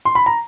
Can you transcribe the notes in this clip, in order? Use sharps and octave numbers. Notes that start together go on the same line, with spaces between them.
C6
B5
A#5